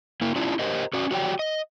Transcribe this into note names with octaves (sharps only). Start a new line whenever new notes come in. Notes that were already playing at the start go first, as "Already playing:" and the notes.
A#3 E4
C#4 D4 E4 F4
G4 A#4 C5 D#5
C#4 F#4 D5
F#4 G4 C#5 D5 F#5 G5
D#5